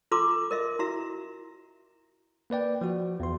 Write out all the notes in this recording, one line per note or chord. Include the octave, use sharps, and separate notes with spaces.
F4 A4 A#5 C6 D6 E6
A#4 D#5 E5
E4 F#4 E5 A#5
A#3 B4 D5 G5
F3 F#4
E2 C6